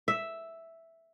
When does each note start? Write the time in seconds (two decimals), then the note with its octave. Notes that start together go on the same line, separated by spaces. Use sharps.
0.08 E5